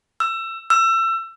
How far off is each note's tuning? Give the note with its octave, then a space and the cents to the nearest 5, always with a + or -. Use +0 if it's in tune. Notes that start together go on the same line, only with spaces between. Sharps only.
E6 +20
E6 +25